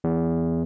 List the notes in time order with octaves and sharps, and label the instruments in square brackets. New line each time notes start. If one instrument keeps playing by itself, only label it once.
[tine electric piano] E2